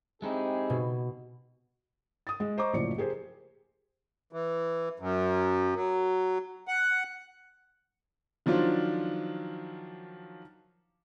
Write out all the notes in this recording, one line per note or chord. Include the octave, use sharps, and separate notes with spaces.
G#3 C4 D#4 E4 G4 G#4
B2
D#6 A6
G#3
C5 D#5 A#5 C#6 D6
F#1 A2 F3 D5 C#7
G4 G#4 A#4 C5
E3
F#2
F#3
F#5
D#3 F3 F#3 D4 F4